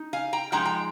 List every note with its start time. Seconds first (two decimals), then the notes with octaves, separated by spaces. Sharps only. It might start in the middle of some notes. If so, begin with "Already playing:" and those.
Already playing: D#4
0.13 F5 G#5
0.33 G5 A#5
0.52 F3 G#3 D#4 G5 A#5
0.65 G5 A#5